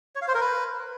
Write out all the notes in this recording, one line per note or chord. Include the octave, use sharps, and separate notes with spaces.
C#5
F5
C5
A#4
B4